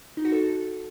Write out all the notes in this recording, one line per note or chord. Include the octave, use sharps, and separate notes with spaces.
D#4
F#4
A4